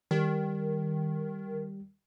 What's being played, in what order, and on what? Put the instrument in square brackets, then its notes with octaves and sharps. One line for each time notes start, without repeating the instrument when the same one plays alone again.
[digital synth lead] D#3 [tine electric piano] G3